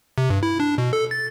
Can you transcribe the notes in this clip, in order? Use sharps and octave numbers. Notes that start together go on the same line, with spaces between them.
C3
G2
E4
D4
B2
A4
A6